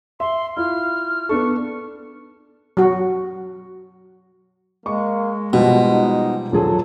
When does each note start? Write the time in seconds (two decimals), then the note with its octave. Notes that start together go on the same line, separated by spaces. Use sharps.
0.20 E5 C6
0.57 E4 F4 F6
1.29 B3 D4 A4 C#6
2.77 F#3 F#4
4.86 G#3 A#3 C#6
5.53 B2 F3 G3 F#4
5.91 D#4
6.52 D#1 F3 F#3 G#4 A4